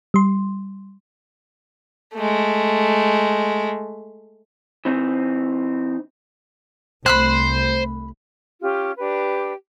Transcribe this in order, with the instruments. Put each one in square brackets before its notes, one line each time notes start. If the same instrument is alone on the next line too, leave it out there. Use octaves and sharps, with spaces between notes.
[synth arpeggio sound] G3 C6
[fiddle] G#3 A3
[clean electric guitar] E3 C4 D#4
[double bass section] C2 A3 [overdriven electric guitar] C5 [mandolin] B5 F6 F#6
[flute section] C#4 F4 G4
D4 G4 B4